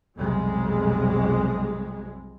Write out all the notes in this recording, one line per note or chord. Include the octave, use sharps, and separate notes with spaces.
B1 F2 C3 G3 G#3